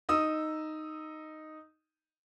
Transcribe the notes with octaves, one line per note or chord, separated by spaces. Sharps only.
D#4 D#6 E6